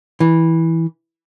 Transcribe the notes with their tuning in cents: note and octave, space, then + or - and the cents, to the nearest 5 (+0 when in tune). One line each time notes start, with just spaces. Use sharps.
E3 -10